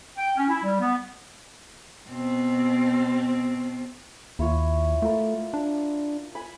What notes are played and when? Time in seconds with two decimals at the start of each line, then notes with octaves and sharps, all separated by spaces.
0.18 G5
0.36 C#4
0.48 E4
0.64 G3
0.80 B3
2.08 B2 C4
4.39 D#2 E4 F4 C#5
5.02 A3 F4 A#4 D5
5.54 D4
6.35 G#5 B5